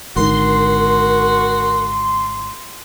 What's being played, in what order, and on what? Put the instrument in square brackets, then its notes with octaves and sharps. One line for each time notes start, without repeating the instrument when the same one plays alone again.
[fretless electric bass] G#1 D3 D#3 [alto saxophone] F#4 [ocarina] A#4 [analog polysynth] C6